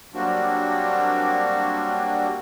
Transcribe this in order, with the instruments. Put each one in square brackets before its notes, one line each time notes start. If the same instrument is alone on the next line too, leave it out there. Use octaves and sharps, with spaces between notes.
[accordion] F#3 G3 A#3 C4 D4 F#4